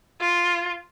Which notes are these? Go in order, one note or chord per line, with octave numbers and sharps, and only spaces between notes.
F4